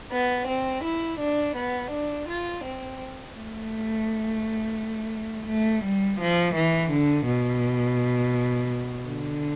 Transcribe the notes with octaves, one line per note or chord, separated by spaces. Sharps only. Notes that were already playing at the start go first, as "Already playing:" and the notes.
B3
C4
E4
D4
B3
D4
F4
C4
A3
A3
G3
F3
E3
D3
B2
D3